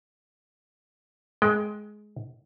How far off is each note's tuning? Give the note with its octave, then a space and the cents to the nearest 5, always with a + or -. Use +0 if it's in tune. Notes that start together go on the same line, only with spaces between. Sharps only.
G#3 +15 G5 +0